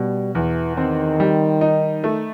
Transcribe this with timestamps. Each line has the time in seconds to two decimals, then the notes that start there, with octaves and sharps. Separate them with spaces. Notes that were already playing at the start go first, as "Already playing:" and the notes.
Already playing: B2 G3
0.35 E2 E3
0.77 D#3 C4
1.20 G3
1.61 D#4
2.04 A3